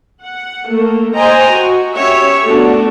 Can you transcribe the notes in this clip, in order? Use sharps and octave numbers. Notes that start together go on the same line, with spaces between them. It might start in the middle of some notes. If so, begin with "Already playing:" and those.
F#5
A3 A#3
C5 D#5 G5 G#5 A#5
F#4
C#4 G4 C#5 E5
A3 B3 D4 F#4 A4